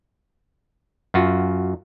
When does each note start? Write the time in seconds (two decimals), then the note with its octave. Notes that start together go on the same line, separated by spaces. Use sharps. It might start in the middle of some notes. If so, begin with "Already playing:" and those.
1.14 F#2 F4 F#4